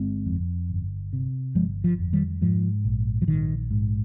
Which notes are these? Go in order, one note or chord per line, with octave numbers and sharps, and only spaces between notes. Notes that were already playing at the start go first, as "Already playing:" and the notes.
Already playing: G1 G#3 C4
F2
G1
C3
G1 F3 G#3
F3
F2
D#3 G3
G#2 F3
A#1
F3
A#1 D#3
G#2